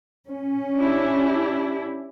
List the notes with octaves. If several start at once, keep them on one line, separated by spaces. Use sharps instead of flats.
C#4
D4 E4 G4